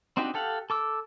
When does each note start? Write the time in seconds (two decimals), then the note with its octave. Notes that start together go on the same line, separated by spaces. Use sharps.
0.17 C4 D4 D#4 F#4 G4
0.34 G4 A4 F5 F#5
0.70 A4 D6 E6